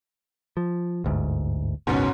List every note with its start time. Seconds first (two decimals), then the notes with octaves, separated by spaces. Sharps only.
0.57 F3
1.04 G1 D2 G#2
1.87 F#1 C#2 G#2 B2 C#4